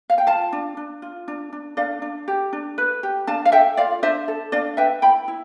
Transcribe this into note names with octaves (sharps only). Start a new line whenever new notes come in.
F5
G5
F4 F5 A5
D4
D4
F4
D4
D4
D4 D5 F5
D4
G4
D4
B4
G4
D4 F5 A5
F5
A4 E5 G5
F4 D5 F5
D4 C5 E5
A4
D4 D5 F5
B4 E5 G5
E4 G5 B5
E4